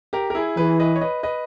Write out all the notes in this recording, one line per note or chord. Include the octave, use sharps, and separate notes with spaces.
G4 A#4
A#4
E4 G#4
E3 G#4 B4
B4 D#5
C#5
B4 D#5
B4 D#5